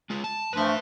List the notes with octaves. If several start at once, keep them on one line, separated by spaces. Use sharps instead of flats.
G#3 F4
A5
G2 F3 A3 B4 E5